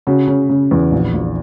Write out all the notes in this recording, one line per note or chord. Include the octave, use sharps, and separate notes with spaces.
C#3 F#4
C#3
C#3
E2
A#1
A#1